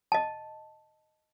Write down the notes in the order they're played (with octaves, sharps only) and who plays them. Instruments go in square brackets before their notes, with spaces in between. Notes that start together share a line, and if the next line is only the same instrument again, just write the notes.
[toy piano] D#5 A5